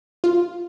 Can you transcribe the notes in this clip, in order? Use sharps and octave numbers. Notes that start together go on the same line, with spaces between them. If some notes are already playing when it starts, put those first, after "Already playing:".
F4